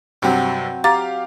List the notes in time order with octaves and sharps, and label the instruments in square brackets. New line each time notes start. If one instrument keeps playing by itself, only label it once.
[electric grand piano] G2 C3 [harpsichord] F#3 C4
[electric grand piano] G4 F5 [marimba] A#5 D6 A6